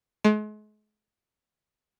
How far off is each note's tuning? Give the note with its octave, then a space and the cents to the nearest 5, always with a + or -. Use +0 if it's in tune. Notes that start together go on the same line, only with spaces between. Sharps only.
G#3 +40